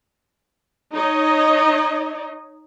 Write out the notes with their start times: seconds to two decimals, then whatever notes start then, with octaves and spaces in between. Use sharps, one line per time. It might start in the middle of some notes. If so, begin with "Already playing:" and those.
0.93 D#4 C#5 D#5